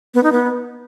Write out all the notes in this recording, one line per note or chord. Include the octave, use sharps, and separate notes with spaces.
B3
D#4
B3